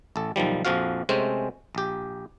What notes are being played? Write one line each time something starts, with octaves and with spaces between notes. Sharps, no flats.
A1 A4
B1 D#3 F3 G3
A#1 F2 F3 F#4 F5
C3 G#3 A3 C4 C#4
A#1 G4